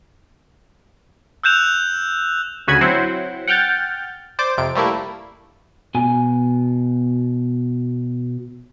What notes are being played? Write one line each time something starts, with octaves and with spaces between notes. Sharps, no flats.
E6 F#6 G6 E7 F7
D2 C#3 F#4 G#5 B5 G#6
F#3 C4 E4 C5 F#5
F#5 G5 F6 G6 A6
C5 D5 D6
F2 C3 D7
G3 A3 A#3 E4
B2 G#5